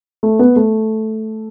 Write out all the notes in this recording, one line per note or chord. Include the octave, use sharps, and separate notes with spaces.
A3
B3
A3